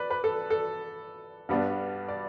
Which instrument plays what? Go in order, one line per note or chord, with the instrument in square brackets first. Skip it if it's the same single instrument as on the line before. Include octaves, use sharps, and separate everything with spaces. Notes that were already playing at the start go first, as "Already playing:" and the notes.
Already playing: [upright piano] B4 D5
B4
A4
A4
G2 G3 B3 D4
D5